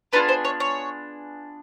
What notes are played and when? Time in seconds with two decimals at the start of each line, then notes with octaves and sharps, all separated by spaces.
0.13 B3 D4 F4 G#4 B4
0.29 C5
0.45 C#5
0.60 C#5